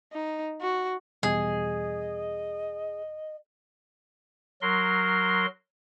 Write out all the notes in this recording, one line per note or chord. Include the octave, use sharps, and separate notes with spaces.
D#4
F#4
E2 B2 G3 G#4 D#5
F#3 A#4 C6